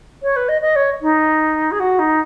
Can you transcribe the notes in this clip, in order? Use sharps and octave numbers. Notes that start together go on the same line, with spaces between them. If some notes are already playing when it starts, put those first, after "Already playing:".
C#5
B4
D#5
D#5
C#5
D#4
G#4
F#4
D#4